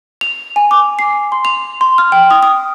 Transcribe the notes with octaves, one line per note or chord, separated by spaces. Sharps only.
F7
G#5
D6
C7
C6
F7
C6
F6
G5
D#6
D#6